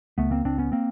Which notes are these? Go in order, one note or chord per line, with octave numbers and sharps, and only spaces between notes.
C#2 A3 B3
A#3 C4
C#2 C4 D4
B3 C#4
A#3 C4